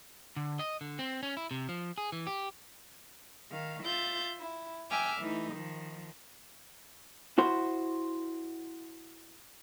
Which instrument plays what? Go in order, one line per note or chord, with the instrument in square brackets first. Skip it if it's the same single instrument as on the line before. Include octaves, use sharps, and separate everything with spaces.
[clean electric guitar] D3
D#5
D3
C4
C#4
E4
C3
F3
G#4
E3
G4
[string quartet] D#3 F5
F4 E5 G6 A6
E4
E5 G5 G#5 D6 F6
E3 A3 D#4
D#3 F3
[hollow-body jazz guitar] E4 F#4 C5